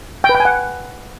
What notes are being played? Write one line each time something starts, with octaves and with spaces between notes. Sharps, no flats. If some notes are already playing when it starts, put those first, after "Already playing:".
G5
B4
G5
G#5
F#5